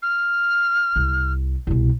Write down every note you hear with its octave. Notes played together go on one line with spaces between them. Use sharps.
F6
C2
C2 B2